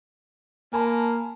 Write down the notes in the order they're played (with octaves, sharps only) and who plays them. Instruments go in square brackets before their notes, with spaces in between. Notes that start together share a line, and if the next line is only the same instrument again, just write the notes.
[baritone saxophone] A#3 [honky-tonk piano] G#5 A5 B5